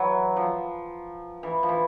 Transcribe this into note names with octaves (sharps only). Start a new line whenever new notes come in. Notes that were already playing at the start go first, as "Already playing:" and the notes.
Already playing: E3 F#3
F3
E3
F3
E3